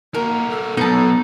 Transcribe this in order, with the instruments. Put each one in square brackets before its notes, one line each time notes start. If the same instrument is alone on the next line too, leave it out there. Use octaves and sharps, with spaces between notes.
[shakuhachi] A#3 [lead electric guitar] D#4 F#4 [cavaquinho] A#4
[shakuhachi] A4
[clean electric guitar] B1 G2 B3 [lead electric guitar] B2 [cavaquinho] D#4 A5